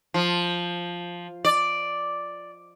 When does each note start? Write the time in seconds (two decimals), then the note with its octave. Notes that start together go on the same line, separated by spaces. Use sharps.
0.14 F3
1.45 D5